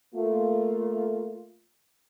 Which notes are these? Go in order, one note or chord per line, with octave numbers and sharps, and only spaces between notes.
A3 A#3 F4